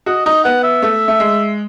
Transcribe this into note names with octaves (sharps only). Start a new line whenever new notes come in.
F#4 D#5
D#4 D#5
B3 F#5
E5
A3
A3
G#3